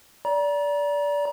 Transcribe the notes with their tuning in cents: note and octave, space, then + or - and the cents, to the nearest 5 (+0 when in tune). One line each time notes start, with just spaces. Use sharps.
D5 -20 A#5 +35